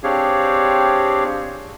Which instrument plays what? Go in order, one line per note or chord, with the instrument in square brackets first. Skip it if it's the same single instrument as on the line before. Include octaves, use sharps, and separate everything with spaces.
[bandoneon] C4 D4 G4 G#4 C#5 F5